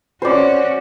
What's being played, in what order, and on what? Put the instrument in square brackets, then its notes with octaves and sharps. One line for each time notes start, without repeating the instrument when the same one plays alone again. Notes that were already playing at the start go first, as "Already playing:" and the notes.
[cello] C#4 F#4 [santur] C5 D5